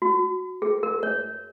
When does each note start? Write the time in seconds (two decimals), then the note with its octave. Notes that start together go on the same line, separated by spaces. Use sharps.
0.02 F#4
0.62 G#4
0.83 A#4
1.03 C#5